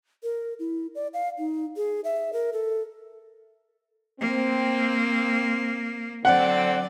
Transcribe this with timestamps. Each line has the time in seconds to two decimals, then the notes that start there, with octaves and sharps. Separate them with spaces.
0.23 A#4
0.59 E4
0.95 D5
1.14 F5
1.38 D#4
1.77 G#4
2.04 E5
2.33 A#4
2.53 A4
4.20 A#3 C4
6.25 D3 F#3 C4 D5 F#5